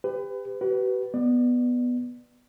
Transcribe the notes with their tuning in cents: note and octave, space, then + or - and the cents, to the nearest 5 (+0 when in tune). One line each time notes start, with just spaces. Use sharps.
G4 +25 B4 +30
G4 -45 B4 +0
B3 +0 D5 +25